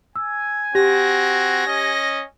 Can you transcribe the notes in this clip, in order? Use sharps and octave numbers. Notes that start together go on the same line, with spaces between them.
G#5 E6
C4 F#4 G4 A#6
C#4 D#5